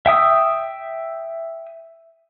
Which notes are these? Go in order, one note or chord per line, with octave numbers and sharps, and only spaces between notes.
E5 G5 D#6 E6